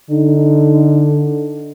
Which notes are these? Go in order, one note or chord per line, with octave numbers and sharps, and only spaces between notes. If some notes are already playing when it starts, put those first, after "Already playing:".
D3 D#4